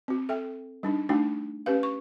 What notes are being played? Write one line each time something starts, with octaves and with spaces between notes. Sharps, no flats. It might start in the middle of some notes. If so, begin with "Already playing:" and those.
C4 F#4
A4 E5 G5
G3 D4 D#4
A3 D4 D#4 F#4 G5
C#4 G4 B4 F5
C#6